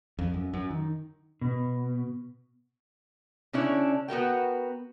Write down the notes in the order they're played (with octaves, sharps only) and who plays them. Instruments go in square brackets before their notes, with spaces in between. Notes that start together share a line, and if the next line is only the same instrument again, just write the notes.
[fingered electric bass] F2
F#2
F#2
D#3
[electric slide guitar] B2
[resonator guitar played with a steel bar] C#3 C#4 D4 E4 C#5
B3 F#4 A#4 G5